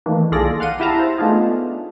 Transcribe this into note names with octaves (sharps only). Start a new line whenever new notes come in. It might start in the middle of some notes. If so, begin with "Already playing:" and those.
D#3 E3 A3 A#3 D4
B1 F4 G#4 A4 D5 A#6
F5 F#5 C6 D#7
E4 G4 E5 F5 A5 A#5
C5
A3 B3 D4 D#4 F4 G#4